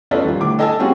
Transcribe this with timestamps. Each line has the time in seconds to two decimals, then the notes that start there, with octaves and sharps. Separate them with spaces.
0.11 C#4 F4 A4 B4 D5 D#5
0.25 D#1 F4
0.40 A2 D3 D6
0.59 A4 D#5 G#5 A5 E6
0.79 G3 C4 C#4 F4 F#4 G#4